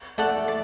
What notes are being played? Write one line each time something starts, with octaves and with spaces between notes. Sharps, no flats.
A3 A4 D5 F#5
D5